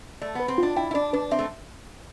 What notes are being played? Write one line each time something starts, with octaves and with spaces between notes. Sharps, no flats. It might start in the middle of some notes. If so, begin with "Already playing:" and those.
A3 D5
B3 B4
C4
D4 F4
E4 G5
E4
D4 D5
D4 B4
C4 E5
A3